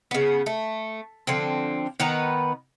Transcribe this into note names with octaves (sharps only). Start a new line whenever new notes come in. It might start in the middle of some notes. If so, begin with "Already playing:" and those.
C#3 B3
A3
D3 F3 C4
D#3 B3 B4 A#5